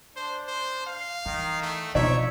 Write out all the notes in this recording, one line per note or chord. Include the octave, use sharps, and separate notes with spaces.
D4 C5
C5
F5
D#3 E3
A3
B2 F3 D#4 C#5 D5 E5